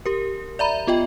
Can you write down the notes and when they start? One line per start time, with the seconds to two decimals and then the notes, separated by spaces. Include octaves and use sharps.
0.06 G4 A#4
0.59 D5 E5 A#5 B5
0.87 B3 F4 D#5 G5